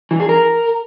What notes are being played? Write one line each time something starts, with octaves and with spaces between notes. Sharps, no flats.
E3
G#4
A#4